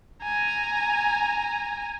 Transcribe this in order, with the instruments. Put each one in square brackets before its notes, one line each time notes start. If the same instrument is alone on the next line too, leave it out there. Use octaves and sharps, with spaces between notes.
[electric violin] G#5 A#5